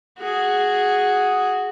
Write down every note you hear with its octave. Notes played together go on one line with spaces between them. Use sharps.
F#4 G#4